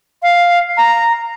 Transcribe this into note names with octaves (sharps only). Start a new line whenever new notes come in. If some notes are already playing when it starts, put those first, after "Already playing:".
F5
A#5